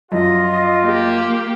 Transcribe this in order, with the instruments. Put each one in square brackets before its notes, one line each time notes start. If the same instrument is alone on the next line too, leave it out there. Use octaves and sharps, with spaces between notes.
[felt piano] F#2 F3 [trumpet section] F4 [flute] D#5
[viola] A#3 G4